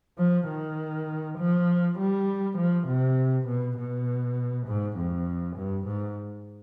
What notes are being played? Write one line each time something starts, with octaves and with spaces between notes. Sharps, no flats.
F3
D#3
F3
G3
F3
C3
B2
B2
G#2
F2
G2
G#2